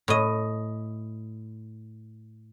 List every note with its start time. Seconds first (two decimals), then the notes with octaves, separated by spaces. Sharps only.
0.08 A2 D#5